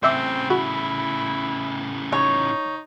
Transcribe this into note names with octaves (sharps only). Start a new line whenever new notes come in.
A2 C#3 C4 C5 E5 D6
E4 F#4
C#4 D#4 C#5